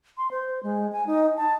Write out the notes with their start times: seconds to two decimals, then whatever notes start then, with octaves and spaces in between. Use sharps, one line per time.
0.18 C6
0.31 C5
0.63 G#3
0.92 G#5
1.07 D#4
1.37 A5